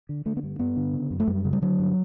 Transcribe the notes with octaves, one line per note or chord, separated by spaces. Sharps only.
D3
D3 A3
B3
G2
G2 B3
D3
C#3
F#2
A3
F#2 G3
C#3
G3
D3 F#3
G2